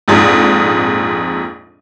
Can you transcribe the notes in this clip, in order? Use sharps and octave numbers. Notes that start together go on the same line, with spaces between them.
A#1 F2 G#2